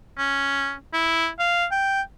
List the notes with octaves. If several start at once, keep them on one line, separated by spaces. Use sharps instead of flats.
C#4
E4
F5
G5